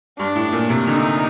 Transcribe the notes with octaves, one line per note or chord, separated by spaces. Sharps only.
G2 D4
A2
A#2
C3
D3 D#4